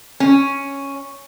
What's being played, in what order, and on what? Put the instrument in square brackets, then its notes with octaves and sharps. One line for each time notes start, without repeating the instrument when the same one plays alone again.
[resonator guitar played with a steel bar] C#4